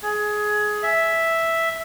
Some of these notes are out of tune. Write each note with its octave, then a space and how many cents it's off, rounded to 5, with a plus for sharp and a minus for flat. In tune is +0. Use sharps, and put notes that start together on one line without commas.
G#4 +15
E5 +0